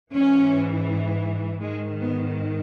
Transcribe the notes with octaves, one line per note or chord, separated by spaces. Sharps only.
G#2 E3 C#4
G#2 D#3 G#3
B3